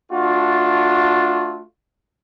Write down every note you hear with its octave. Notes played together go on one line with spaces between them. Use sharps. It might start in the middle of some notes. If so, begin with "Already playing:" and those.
A3 D4 F4 F#4